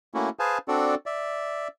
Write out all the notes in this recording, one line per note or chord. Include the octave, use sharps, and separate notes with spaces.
A3 A#3 C#4 E4 F#4
G#4 B4 C5 F5 G#5 A5
C4 D4 F#4 A4 D5
D5 E5